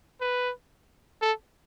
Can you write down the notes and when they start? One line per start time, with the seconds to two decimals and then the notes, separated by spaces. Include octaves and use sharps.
0.21 B4
1.22 A4